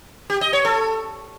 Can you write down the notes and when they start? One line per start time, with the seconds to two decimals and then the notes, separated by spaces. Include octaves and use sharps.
0.30 G4
0.41 D#5
0.53 C#5
0.65 A4